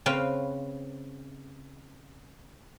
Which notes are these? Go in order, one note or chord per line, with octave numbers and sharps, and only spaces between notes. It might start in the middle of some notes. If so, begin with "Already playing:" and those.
C#3 C4 B4 F5